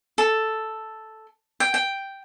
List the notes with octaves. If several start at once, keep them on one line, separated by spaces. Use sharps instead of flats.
A4
G5
G5